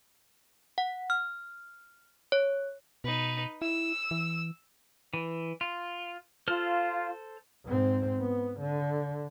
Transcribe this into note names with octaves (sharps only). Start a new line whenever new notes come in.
F#5
F6
C#5
B2 D#4 B4
E4 E6
E3
E3
F4
F4 A4 C5 F6
G#2 C4
B3
D3